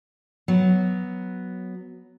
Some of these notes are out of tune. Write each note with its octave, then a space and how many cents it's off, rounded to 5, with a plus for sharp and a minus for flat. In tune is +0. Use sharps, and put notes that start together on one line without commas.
F#3 +0 B3 +0